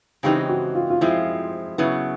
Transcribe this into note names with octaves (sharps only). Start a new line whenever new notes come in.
C#3 E3 G#3 C4 D#4 G4
F#4
F4
F4
F3 G#3 C4 E4
C#3 F#3 B3 E4